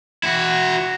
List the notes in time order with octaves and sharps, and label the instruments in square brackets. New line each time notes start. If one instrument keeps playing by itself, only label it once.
[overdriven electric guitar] E4 F#4